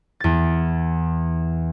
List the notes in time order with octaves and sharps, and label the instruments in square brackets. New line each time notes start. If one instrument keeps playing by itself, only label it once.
[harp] E2 A6